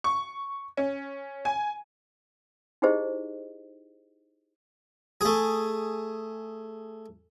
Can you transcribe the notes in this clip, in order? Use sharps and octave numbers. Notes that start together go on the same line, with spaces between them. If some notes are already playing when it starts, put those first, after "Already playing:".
C#6
C#4
G#5
D#4 E4 G4 G#4 C5 D#5
A3 G#4